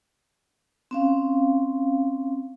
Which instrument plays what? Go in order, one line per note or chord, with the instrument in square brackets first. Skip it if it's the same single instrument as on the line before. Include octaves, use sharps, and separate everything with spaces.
[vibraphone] C4 C#4 F5